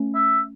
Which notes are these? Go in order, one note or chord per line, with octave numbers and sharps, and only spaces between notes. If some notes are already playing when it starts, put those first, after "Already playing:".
Already playing: A3 C#4
E5